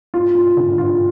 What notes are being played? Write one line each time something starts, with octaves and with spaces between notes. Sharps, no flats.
F4
F4
D3
F4